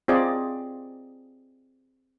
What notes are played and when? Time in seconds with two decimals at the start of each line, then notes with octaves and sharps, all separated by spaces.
0.08 C4 F4 G#4 D5 D#5